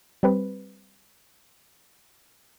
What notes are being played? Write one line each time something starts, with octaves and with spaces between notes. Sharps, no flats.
G3 C4 B4